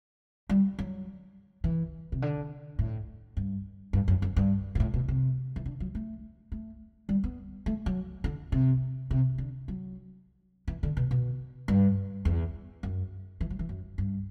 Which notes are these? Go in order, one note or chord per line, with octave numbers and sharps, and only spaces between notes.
G3
F#3
E3
C3
D3
A2
G2
G2
F#2
F#2
G2
B2
A2
B2
C3
E3
D3
F#3
A3
A3
G3
B3
A3
F#3
D3
C3
C3
D3
F#3
E3
D3
B2
B2
G2
E2
F#2
E3
F#3
E3
F#2
G2